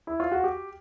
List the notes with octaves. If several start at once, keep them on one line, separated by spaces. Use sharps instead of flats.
E4
F4
F#4
G4